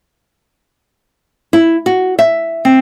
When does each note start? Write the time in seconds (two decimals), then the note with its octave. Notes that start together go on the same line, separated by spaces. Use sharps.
1.53 E4
1.86 F#4
2.19 E5
2.65 C4